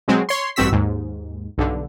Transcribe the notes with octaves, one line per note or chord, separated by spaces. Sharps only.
B2 F#3 G#3 C4
C#5 C6
A1 G2 C4 F#4 E6 B6
D#2 G#2
B1 G2 D3